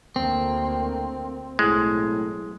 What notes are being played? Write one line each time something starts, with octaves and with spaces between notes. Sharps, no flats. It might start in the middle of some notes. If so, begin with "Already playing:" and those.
D2 A#3 C4
B1 A2 G#3